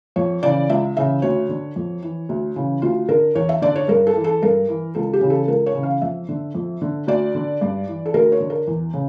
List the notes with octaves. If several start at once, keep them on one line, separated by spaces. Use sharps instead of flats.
F2 C#5
C#3 E3 D5
C#2 E5
C#3 E3 E5
D2 C#5
D3
F2
E3
D2
C#3 E3
D2 F4
D3 A#4
E2 C#5
E5
D3 D5
C#5
G2 A#4
A4
E3
A4
G2 A#4
E3
C#2 A4
G4
C#3 E3
A4
C#2 A#4
C#5
C#3 E3
F5
F2 E5
D3
F2
D3
D2 D5
D3
G2
E3
A4
D2 A#4
C#5
D3
A#4
E2
C#3